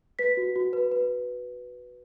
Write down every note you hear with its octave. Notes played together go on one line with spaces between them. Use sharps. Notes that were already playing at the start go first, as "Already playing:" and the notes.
B4 B6
F#4
F#4
B4
B4